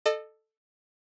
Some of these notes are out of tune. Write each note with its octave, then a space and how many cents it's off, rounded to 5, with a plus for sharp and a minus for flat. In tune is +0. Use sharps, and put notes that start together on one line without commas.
A4 +0 D#5 -35